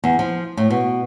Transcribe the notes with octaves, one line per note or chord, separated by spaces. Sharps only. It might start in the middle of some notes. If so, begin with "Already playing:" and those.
E2
F3
A2
B2